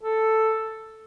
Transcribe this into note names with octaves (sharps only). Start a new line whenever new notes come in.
A4